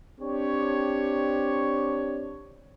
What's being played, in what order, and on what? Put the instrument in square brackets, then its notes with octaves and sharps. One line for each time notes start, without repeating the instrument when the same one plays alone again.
[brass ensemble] C4 D4 G4 C#5